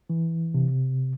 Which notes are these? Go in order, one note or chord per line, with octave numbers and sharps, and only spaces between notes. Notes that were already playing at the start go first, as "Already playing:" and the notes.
E3
C3